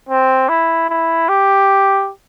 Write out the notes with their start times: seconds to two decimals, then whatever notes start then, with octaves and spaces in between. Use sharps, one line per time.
0.09 C4
0.49 E4
0.89 E4
1.28 G4